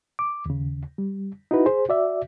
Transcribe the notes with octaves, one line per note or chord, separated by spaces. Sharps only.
D6
D#2 C#3
G3
D#4 E4 F#4 B4
G#4 C5
F#4 D5 E5